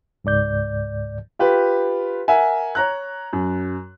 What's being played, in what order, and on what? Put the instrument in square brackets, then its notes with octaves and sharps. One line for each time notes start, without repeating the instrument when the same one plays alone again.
[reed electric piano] C#2 G#2 D5 G6
[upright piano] F4 G4 B4
A#4 E5 F#5 G#5
C#5 A#5 F#6
F#2